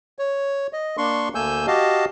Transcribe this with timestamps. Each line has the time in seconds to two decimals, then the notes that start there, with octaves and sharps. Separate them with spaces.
0.19 C#5
0.73 D#5
0.97 A#3 D4 C6 C#6
1.35 D2 A3 A#3 G#5 E6 G6
1.67 F#4 G4 D#5 F5 A5